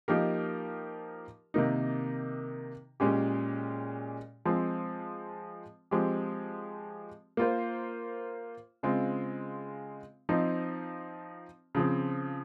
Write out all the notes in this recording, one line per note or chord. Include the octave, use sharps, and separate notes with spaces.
F3 A#3 D#4 G4 A#4
C3 D#3 A#3 D#4
A#2 G#3 C#4 G4
F3 G#3 C4
F3 G#3 C4 G4
A#3 F4 C5
C#3 G#3 C4 F4
F3 C4 D#4
C#3 F3 C4